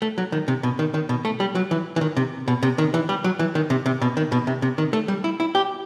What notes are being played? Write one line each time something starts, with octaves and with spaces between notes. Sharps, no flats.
A3
F#3
D#3
C3
B2
D#3
D#3
B2
A3
G3
F#3
E3
E3
D#3
C3
B2
C3
D#3
E3
G3
F#3
E3
D#3
C3
C3
B2
D#3
B2
C3
C3
D#3
A3
G3
E4
E4
G4